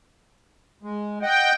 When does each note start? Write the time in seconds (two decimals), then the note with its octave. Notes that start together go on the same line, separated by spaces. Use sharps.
0.83 G#3
1.22 D#5 F#5 G5